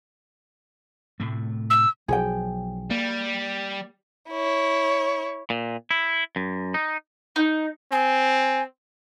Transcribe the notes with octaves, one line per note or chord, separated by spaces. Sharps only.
A2 C3 A3
E6
B1 F3 F#3 G#4 G5
G3 A#3
E4 C#5
A#2
E4
F#2
D#4
D#4
C4 G#5